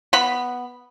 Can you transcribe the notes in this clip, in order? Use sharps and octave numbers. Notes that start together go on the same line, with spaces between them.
B3 B5